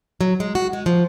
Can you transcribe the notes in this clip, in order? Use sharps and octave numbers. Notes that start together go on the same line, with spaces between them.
F#3
G#3
F#4
G#3
F3